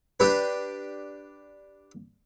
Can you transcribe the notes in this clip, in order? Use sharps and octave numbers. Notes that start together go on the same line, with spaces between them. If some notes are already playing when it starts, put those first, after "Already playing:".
D4 G4 B4